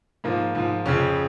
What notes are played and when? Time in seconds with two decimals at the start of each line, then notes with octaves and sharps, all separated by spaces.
0.24 G#2 F3 A#3
0.55 G#2 F3
0.86 F2 C#3 F3 C#4